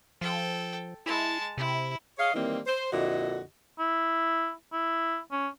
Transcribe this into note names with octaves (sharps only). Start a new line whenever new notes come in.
F3 A4 G5
G#3 E4 A5
C3 E4
G#4 C#5 D#5 F5
D#3 E3 G3 A#3 C4 E4
C5
F2 A#2 D3 E4 F#4 D#5
E4
E4
C#4